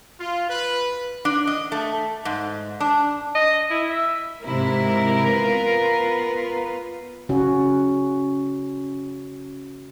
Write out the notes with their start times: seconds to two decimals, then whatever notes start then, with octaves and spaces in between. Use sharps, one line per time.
0.19 F4
0.49 B4
1.25 D4
1.47 D#5
1.72 A3
2.25 G#2
2.80 D4
3.35 D#5
3.70 E4
3.90 E5
4.44 G#2 C3 E4 A#4
5.31 B3 F4 B4
7.29 C#3 C#4 F#4